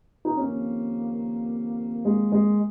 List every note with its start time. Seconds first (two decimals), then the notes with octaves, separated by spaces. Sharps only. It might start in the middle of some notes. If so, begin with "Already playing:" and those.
0.25 D#4
0.37 F2 C3 D#3 A#3 C#4
2.05 G#3
2.32 G#3